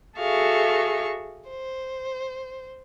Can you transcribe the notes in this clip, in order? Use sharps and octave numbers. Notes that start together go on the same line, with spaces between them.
F#4 G#4 A4 E5 F5 C#6
C5